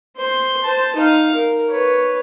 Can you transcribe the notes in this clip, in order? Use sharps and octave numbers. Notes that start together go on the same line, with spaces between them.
C5 C6
C5 A5
D#4 F5
A#4
B4 C#5